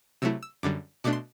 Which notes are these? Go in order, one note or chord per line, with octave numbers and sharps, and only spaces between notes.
C3 F#3 A3 E4 E6
E6
F#2 D3 G3 D6
B2 A3 D4 D6
C6